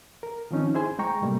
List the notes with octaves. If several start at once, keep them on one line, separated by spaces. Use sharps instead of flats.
A#4
D#3 F3 C4 C#4 D#4
E4 G#4 C5 G#5 C6
G#3 G#4 G5 A#5 C#6
A2 C3 G3 A3 A#3